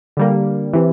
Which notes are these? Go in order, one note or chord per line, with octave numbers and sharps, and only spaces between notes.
D3 G3 A#3
C3 E3